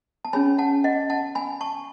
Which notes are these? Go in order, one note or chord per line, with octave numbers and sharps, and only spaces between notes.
A5
C#4 G#4 C#5 G#5 B5
F#5 A5
D#5 F#5
F#5 A5
G#5 B5
A5 C#6